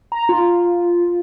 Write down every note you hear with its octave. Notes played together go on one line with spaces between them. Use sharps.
A#5
F4